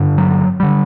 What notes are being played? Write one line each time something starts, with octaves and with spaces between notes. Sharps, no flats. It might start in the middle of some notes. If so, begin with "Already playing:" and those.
Already playing: G2 D3
F#3
D3 G3